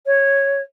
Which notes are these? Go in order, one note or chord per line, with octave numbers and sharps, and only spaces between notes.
C#5